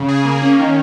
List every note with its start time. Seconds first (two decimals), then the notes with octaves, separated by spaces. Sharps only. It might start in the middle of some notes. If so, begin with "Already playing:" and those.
Already playing: C#3
0.08 G#4
0.25 A#3
0.42 C#4
0.59 D#3